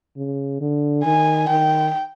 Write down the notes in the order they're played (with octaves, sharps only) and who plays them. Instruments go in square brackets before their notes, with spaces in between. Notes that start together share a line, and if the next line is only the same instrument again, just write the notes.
[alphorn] C#3
D3
[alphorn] D#3 [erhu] G#5
[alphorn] D#3 [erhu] G5